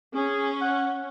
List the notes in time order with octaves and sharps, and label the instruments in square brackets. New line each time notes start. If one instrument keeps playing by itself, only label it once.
[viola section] C#4 [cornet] G#4
[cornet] F#5